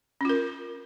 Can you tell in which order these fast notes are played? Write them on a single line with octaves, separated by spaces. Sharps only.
C#4 F4 A#4